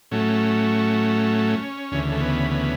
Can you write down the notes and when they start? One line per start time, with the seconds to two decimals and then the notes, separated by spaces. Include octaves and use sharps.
0.11 A2 F#3 A3 C#4
1.91 D2 C#3 E3
2.12 A3
2.21 B3
2.51 B3